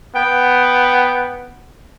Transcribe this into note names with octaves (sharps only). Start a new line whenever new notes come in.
B3 G5